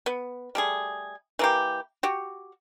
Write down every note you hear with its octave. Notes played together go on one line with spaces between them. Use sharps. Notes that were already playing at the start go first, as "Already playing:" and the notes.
B3
G3 A3 G#4
E3 A#3 G4
F#4 G4